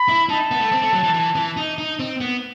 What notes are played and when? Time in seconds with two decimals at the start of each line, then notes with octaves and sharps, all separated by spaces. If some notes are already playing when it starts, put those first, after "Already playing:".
Already playing: B5
0.09 E4
0.29 D#4 A5
0.51 B3
0.61 A3
0.72 C4
0.82 A3
0.93 F#3
1.03 E3
1.14 E3
1.35 E3
1.57 D#4
1.78 D#4
2.00 C4
2.21 B3